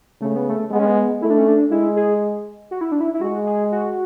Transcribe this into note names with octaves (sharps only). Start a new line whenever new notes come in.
C#3 A3
B3
A3
G#3 B3
C#4
B3
A3 E4
D4
C#4
D4
G#3 E4
G#4
F#4
E4
D4
E4
E4
G#3 F#4
G#4
F#4